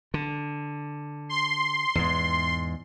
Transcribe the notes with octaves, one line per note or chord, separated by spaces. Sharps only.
D3
C6
E2 G#2